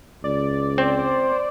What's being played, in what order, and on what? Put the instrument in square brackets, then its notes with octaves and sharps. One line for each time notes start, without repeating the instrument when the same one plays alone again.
[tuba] C#2 [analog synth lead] D5
[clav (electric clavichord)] C4 [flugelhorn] C5